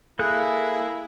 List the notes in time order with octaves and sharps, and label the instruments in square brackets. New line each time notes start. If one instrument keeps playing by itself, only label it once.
[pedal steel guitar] A#3 A4 F#6 [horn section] E4 [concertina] G#4